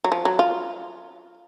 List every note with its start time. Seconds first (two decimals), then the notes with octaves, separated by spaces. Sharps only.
0.04 F#3
0.12 F3
0.25 F#3
0.39 F4